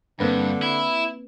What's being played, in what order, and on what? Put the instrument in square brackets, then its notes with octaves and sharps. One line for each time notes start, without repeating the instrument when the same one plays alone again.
[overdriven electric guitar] G2 [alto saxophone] D3 [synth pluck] A#3 C4 B4
[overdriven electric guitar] E4